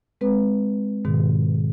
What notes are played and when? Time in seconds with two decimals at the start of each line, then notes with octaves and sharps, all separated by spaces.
0.21 G#3 C4 B4
1.05 G#2 B2 D#3